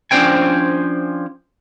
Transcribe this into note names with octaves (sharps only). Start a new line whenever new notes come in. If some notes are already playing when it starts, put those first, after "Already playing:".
F3 C#4 D4 C5 G5 G#5